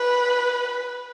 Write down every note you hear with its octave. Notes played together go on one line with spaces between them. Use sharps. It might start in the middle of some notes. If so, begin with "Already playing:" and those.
Already playing: B4